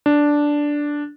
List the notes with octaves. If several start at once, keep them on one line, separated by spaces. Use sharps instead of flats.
D4